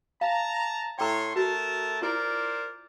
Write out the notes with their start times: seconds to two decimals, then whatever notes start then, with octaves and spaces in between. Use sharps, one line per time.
0.21 F5 A5 A#5
0.99 A2 C#5 G5 A#5 C6
1.36 A3 F#4 A#4 A5
2.02 E4 F4 A#4 C5 D5